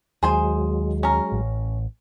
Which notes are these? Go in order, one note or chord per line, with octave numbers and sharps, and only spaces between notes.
D#2 F#3 G#3 G#4 C5 G#5
C#4 A#4
A1